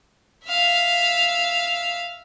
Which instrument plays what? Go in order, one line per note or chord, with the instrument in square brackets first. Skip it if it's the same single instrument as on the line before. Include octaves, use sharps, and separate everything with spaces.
[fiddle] E5 F5